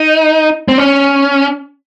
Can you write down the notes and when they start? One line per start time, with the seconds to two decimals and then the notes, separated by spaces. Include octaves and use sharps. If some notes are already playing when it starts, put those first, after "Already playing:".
Already playing: D#4
0.68 C4
0.78 C#4